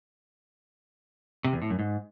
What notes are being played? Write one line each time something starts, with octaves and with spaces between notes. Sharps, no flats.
C3
E2
A2
F#2
G#2